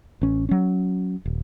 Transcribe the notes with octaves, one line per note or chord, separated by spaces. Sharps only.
A1 C#4
F#3 C#4
D#1